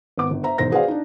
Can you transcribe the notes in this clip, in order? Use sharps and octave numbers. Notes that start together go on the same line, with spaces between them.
G#1 B3 D6
G1
C5 E5 A#5
E1 D#3 C5 A#6
F#4 G#4 B4 C5 D5 F5
D4 D#4